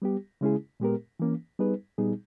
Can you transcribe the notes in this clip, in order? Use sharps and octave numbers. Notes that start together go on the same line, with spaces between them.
G3 B3 G4
C#3 G#3 C#4 E4 G#4
A#2 G#3 B3 G4 A#4
E3 A#3 C#4
G3 B3 D#4 G#4 B4
A#2 G3 B3 D#4 G#4